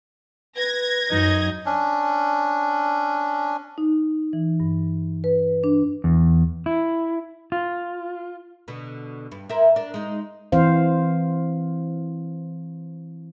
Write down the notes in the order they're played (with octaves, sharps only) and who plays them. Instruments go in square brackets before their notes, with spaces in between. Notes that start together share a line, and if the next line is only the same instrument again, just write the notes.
[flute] B4 [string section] G#6 A#6
[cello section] F#2 [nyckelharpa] D#4
[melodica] C#4 D4
[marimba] D#4
E3
G2
B4
D4
[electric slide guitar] E2
E4
F4
[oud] B2 D3
G2
E4 A#4 C5
D4 A#4
G#3 D#4
[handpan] E3 C4 C5 F5